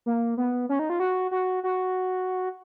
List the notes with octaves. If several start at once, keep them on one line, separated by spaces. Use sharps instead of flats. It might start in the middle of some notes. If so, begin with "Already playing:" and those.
A#3
B3
C#4
D#4
F4
F#4
F#4
F#4